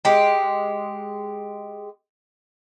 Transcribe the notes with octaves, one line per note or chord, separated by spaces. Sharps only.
G#3 G4